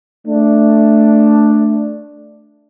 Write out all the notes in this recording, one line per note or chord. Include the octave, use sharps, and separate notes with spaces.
A3 D4